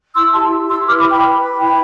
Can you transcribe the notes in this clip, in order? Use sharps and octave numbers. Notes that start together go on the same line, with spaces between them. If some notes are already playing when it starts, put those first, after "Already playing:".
E4 C6 E6
G4 A5 C6
G4
E4 C6 E6
B4 D6 F6
B5 D6
B4
G5 B5
B4
B4
E4 G5 B5